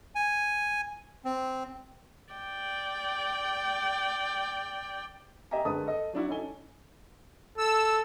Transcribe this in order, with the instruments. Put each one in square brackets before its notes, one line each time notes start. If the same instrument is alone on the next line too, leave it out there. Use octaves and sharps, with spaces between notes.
[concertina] G#5
C4
[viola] D5 G5
[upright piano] G4 D#5 E5 G5 G#5 A#5
G#1 D3 G#3 B4 A5 D#6
A4 D#5
F#3 D4 E4 F#4
C#4 D#4 E4 A4 G#5 G7
[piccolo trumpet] A4 [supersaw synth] E6